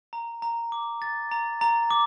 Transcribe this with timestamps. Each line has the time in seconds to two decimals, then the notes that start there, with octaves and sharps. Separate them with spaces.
0.13 A#5
0.42 A#5
0.72 D6
1.02 A6
1.31 A#5
1.61 A#5
1.91 D6